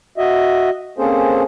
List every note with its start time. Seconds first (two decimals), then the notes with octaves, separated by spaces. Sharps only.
0.18 F#4 D#5 E5
0.98 A#3 C4 C#4 G#4 A4 C5